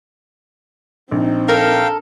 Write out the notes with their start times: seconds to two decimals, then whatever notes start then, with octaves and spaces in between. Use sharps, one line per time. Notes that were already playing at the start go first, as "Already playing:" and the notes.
1.11 A#1 C4 D#4
1.48 A4 A#4 F5 G5